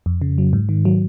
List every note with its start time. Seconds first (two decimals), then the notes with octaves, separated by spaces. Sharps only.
0.06 F2
0.22 C#3
0.38 F#3
0.53 G#2
0.69 D#3
0.85 F#3